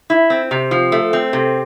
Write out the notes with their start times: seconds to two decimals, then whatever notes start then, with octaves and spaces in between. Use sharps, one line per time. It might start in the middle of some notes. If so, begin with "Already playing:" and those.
0.10 E4
0.30 C4
0.51 C3
0.71 F3
0.92 A3
1.13 C4
1.33 C3